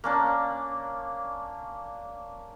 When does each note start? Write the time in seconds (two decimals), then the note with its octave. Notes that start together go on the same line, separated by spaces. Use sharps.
0.04 A#3 C#4 D4